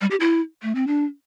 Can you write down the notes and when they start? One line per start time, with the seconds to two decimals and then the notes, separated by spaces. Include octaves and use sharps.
0.01 G3
0.11 G4
0.20 E4
0.62 A3
0.75 C4
0.87 D4